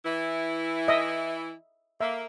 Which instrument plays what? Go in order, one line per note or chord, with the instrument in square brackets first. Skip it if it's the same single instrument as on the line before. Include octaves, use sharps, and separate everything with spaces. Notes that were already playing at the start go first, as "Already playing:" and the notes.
[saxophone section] E3 E4
[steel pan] D#5 E5
[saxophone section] A#3 [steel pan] E5